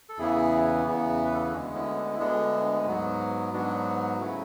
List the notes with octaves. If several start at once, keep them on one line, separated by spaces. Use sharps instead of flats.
A4
E2 C#3 E3 B3 E4 G#4
E2 C#3 E3 B3
B4
A4
G#4
D2 D3 G#3 B3 D4 F#4
C#4 E4
D4
E4
D2 D3 G#3 B3 D4
G#2 F#3 B3
G#2 F#3 B3 D4
C#3 F#3 A3 C#4 E4